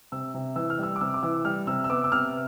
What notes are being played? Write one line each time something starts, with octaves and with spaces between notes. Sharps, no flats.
C3 E6
C3
E3 E6
F6
G3 E6
D6
C3 E6
D6
E3 E6
G3 F6
C3 E6
E6
B3 D6
E6
C3 F6